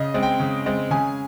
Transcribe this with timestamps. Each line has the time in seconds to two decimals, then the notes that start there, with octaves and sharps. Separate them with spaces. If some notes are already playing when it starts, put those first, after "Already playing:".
Already playing: C#3 D#5
0.14 G#3 C4
0.23 G5
0.40 C#3
0.66 G#3 C4
0.91 C#3 G#5